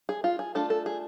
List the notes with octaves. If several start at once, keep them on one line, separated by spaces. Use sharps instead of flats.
G#4
F4
G#4
A3 D4 F4 A4
A4
G#4